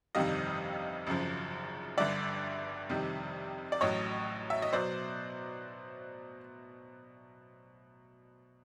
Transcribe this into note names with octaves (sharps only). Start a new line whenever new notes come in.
G1 F2 C3 D#3 G3 D#5 F5
G#1 F#2 C#3 F3
G1 G2 D3 D5 E5
F2 C3 D#3 G3
D5
A1 A2 F#3 C#5 D#5
E5
D#5
B2 F#3 C5 D5